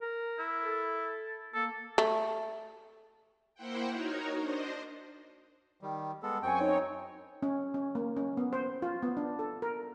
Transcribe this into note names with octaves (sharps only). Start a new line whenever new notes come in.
A#4
E4
A4
A#3 A4
A3
A#3 E4 C5 F#5 G5
D#4 F#4 A#4 C#5
D4 C5 D#5
D#3 G3
G#3 B3 A4
F#2 C4 G5 G#5 C#6
D#4 C#5
C#4
C#4
A#3
C#4
B3
C5
F4
B3
D4
A4
A#4